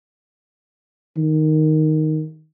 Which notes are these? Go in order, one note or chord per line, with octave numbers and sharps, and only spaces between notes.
D#3